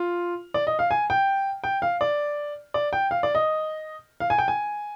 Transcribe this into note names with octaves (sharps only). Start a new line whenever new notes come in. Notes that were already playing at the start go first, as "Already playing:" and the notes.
Already playing: F4
D5
D#5
F5
G#5
G5
G5
F5
D5
D5
G5
F5
D5
D#5
F5
G#5
G5
G#5